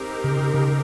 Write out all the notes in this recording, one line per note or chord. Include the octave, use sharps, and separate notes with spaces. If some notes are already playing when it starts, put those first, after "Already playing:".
Already playing: C4 D#4 G4 A#4
C#3
C#3